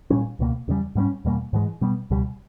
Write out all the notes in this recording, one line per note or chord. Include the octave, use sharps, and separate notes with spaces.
A#2 G3 C#4
C#2 B2 A#3
E2 C#3 E3 G3
G#2 G3 A#3 C#4
E2 B2 G3 A#3
G#2 E3 G#3
B2 G3 B3
C#2 B2 G3